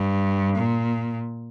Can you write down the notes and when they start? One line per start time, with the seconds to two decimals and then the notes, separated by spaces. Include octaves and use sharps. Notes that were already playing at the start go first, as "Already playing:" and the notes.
Already playing: G2
0.56 A#2